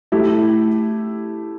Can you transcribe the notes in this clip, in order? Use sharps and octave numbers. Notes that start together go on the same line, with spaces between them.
A3 E4 G4